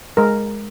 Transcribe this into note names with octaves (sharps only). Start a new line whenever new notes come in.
G#3 A#4